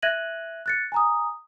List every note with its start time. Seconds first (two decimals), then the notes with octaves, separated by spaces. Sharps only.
0.03 E5 F#6 G#6 A#6 D#7 F#7
0.66 F#6 A6 C#7
0.92 G#5 A#5 D#6